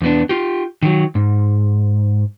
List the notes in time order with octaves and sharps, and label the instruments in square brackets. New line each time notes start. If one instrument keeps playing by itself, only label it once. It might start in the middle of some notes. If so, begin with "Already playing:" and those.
[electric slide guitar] E2 B3 D4
F4 G4
D#3 F#3
G#2